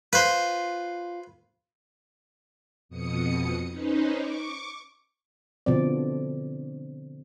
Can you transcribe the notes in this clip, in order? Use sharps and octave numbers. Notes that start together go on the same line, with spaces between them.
F4 B4 C5
F2 B2 D#6 C#7
C#4 D#4 B4 C5
C#6 D6
B2 D3 F3 C4 D5